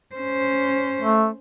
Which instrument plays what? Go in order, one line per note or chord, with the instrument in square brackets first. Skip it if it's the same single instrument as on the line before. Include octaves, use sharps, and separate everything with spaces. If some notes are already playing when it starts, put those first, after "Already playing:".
[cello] C#4 C5
[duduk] A3